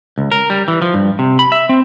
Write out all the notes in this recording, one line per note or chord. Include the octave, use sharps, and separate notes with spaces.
C#2
A#4
G3
E3
F3
G2
C3
B5
E5
C4